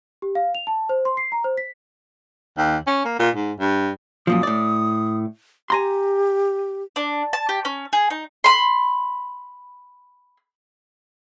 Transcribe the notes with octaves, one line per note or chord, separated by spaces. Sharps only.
G4
F5
F7
A5
C5
C6
C7
A#5
C5
B6
D#2
C#4
A#3
A#2
G#2
G2
F#2 A#2 F3 D#6
A2 D5
G4 G#5 A#5 C6
D4
A5
G4
C#4
G#4
D#4
B5 C6